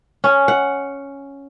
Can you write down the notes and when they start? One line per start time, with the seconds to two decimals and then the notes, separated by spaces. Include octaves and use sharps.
0.24 C#4
0.48 F#5